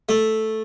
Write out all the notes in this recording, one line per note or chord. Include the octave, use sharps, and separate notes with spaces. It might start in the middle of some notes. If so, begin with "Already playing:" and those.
A3